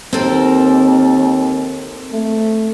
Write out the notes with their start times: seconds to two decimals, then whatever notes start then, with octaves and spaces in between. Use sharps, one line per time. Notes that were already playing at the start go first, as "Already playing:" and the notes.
0.13 D#2 C4 A4 A#4
2.13 A3